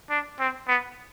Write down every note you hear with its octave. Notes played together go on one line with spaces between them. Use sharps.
D4
C4
B3